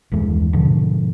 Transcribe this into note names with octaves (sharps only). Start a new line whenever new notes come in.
F#1 D#2 E3 G#3
G#2 B2 D3 F3